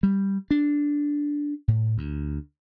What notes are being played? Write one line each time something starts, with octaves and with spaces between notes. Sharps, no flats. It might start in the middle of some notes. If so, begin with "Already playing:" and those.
G3
D4
A2
D2